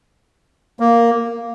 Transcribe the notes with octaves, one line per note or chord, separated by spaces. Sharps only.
A#3